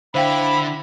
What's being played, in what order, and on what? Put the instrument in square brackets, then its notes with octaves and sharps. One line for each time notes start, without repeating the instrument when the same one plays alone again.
[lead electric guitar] D3 [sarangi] E4 [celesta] C5 F5 G5 [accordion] B5